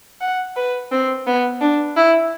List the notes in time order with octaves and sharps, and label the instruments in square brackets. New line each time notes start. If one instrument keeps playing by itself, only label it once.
[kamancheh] F#5
B4
C4
B3
D4
E4